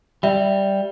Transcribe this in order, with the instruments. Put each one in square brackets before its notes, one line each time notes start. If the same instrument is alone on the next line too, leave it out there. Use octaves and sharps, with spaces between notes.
[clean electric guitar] G3 [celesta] E5